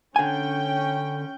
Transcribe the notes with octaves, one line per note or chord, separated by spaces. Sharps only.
D3 C#4 G5 G#5